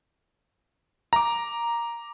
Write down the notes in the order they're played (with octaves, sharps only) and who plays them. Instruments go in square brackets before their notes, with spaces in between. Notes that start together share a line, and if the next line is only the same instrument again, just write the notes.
[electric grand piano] A#5 D6